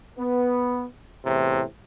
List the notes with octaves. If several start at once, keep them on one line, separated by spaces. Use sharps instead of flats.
B3
E2 A2 C3